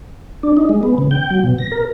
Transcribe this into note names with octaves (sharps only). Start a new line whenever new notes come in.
D4
D#4
G#3
B3
C#3
G5
F#3
B2
A#6
A#4